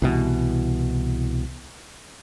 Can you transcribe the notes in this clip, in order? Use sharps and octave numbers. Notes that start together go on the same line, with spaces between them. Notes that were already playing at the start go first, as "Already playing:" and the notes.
C2 B2 E3